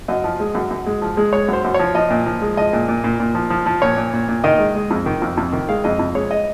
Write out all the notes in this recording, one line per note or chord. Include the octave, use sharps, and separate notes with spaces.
F#2 D#5
F3
G#3
F#2
F#2
G#3
F3
G#3
G#3 C#5
F#2 C5
F#2
F3 C#5
F3 D#5
A#2
F3
G#3
F3 D#5
A#2
A#2
A#2
A#2
F3
F3
F3
A#2 C#5
A#2
A#2
A#2
D#3 D#5
G#3
G#3
F2
D#3
F2
F2
D#3
G#3 F5
F2 D#5
F2
G#3 C#5
D#5